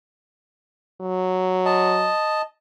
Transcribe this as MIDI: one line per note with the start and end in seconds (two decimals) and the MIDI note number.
1.01 2.11 54
1.65 2.42 75
1.65 2.42 81